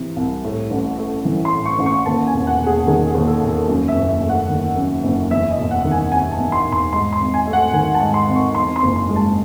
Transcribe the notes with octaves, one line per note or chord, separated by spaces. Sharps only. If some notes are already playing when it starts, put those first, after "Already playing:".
Already playing: C3 E3
C2
A2
A1
A3
E3
C6
A2
C#6
A1
C#6
D#2 A5
G#5
E1
F#5
E1
G#4
D#3 G#4
G#4
D#2
A4
E1
A4
F#2 F#4
E5
F#1
E5
A3
F#5
D#3
F#2
F#1
E2 E5
D#5
E1
F#5
D#3
G#5
C3 G#5
A5
E2
C6
E1
C6
G#2 C6
C6
G#1
G#5
A3
F#5
D#3 G#5
A5
G#2
C6
G#1
C#6
E2 C6
C6
F#1
C6
G#3
A5